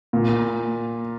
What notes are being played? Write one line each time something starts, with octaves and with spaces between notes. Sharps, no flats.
A#2